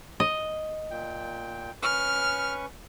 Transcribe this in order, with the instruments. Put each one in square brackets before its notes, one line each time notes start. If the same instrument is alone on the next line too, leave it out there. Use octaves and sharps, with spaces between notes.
[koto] D#5
[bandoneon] A#2 G5
[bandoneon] C#4 B4 C#6 [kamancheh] F6